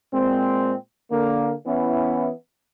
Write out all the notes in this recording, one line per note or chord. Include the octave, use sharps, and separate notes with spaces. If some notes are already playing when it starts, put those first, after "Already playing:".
A#2 G#3 C4
D3 A#3
E3 B3 C#4 E4